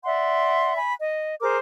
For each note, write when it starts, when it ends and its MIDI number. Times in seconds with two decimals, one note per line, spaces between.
0.04 0.77 74
0.04 0.77 76
0.04 0.77 78
0.04 0.77 84
0.77 0.94 80
0.77 0.94 83
1.00 1.35 75
1.41 1.57 68
1.41 1.57 70
1.41 1.57 72
1.41 1.57 86